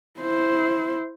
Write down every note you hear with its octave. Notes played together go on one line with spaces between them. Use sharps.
E4 C5